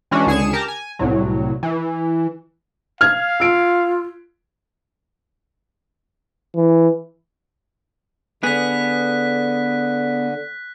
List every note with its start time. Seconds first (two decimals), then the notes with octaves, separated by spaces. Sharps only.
0.11 E3 G#3 C#4 D4 F#4
0.27 C#2 D3 G#4 G#5 C#7 E7
0.53 G4 A#4 A5 A#5
0.68 G#5
0.99 C2 A2 F#3
1.63 E3
3.01 F5 F6 G#6
3.40 F4 E6 D7
6.56 E3
8.43 D3 B3 G#4 F#6 B6